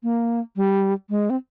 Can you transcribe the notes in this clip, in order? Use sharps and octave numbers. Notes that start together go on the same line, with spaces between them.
A#3
G3
G#3
C4